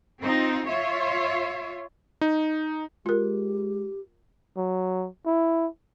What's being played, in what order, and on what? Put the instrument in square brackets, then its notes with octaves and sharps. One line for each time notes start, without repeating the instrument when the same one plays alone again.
[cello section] C4 D#4 F4
F4 C#5 E5
[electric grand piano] D#4
[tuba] G#3 [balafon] F4 A#4 [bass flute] G4
[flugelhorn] F#3
E4